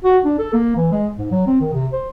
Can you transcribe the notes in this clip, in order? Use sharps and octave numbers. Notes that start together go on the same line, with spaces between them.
F#4
D4
A4
A#3
E3
G#3
G#2
F#3
C4
D#3
C3
C5